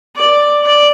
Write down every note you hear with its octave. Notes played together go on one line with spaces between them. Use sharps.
D5
D5